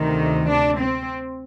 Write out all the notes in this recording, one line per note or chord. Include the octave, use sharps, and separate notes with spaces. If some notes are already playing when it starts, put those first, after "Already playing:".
Already playing: D2 C3 D#3
D4
C4